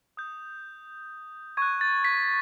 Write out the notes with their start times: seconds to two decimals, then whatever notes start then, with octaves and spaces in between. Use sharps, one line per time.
0.17 D#6 G6
1.57 C#6 F#6 G#6
1.81 A6
2.04 B6